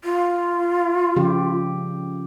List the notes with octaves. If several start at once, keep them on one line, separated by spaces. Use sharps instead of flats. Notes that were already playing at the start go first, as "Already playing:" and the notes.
F4
C#3 F3 G4